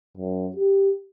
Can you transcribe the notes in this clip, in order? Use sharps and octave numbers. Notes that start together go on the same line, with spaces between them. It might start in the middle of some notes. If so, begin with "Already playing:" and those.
F#2
G4